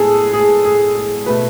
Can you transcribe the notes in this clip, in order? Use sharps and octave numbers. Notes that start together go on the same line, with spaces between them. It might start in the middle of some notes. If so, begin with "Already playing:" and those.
Already playing: A2 G#3 B3 G#4 A4
G#4
G#4
G#4
B2 A3 B4